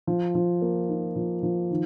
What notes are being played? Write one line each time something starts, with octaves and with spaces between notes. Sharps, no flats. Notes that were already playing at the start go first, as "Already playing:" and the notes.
F3
F3
A#3
D#4
F3
F3
D#3